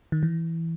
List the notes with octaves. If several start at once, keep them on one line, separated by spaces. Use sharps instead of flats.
D#3
E3